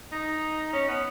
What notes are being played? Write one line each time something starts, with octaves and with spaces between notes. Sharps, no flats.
D#4
C#4
B3